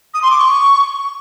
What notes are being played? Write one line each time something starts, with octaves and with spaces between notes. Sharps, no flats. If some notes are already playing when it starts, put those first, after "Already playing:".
D#6
C6
D6
C#6